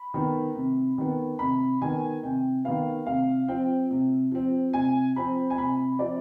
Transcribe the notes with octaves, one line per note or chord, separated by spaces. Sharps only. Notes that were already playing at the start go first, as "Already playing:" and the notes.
Already playing: B5
D#3 B3
C3
D#3 B3
C3 B5
D#3 B3 G#5
C3 G5
D#3 B3 F5
C3 F5
F3 C4 G5
C3
F3 C4
C3 G#5
F3 C4 B5
G#5
C3 B5
F3 C4 D5